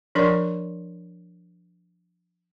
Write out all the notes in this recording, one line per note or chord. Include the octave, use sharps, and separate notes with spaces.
F3 D4 A#4 D5 C6